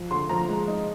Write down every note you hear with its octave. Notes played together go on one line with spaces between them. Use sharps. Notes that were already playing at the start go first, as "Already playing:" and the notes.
Already playing: F3
D3 C6
F3 A#5
G#3
D#4